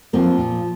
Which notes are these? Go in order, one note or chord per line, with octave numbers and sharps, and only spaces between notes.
F3 A#3 C4
A#2